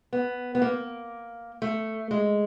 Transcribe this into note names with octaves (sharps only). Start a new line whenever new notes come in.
B3
B3
A#3
A3
G#3